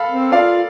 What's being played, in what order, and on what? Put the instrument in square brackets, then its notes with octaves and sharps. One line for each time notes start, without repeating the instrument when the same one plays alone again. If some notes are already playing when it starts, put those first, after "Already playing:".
Already playing: [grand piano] A4 F5 B5
[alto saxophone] C4
[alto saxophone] F4 [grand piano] D5 F5